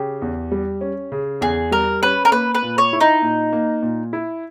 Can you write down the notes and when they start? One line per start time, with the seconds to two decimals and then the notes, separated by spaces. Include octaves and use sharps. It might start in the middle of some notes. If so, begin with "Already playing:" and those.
Already playing: C#3 G4
0.22 E2
0.52 G3
0.81 C#4
1.12 C#3
1.41 E2 G#4
1.71 G3 A#4
2.02 C#4 B4
2.25 A#4
2.32 A#3 B4
2.55 B4
2.62 A#2
2.78 C#5
2.93 E4
3.00 D#4
3.22 A#2
3.53 A#3
3.82 A#2
4.13 E4